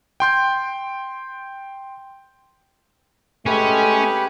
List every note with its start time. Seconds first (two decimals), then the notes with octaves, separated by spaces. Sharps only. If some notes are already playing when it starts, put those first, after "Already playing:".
0.20 G5 C6 G6
3.46 G#3 A3 C#4 G4 B4